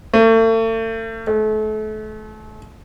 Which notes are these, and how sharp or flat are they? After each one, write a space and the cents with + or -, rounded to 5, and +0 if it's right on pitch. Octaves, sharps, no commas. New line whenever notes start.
A3 +40
A3 -35